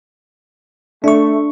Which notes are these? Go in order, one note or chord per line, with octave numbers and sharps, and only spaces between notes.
A3 D4 C#6